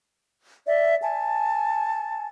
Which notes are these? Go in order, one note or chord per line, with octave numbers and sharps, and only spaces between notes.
D5 E5
G#5 A5